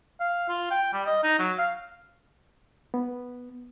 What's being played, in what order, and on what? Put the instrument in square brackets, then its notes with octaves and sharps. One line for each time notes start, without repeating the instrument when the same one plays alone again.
[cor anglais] F5
F4
G5
G3
D#5
D#4
F#3
F5
[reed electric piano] B3